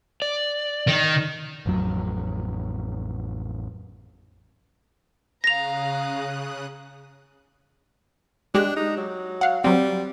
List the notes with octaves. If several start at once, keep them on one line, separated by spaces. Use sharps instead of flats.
D5
D#3
A1 F2 F#3
C#3 F5 A#5 D#6 F#6 A#6 F7
G#3 D4 G4 F#6
D#4
F#3
F5 F#5
F#3 G3 C4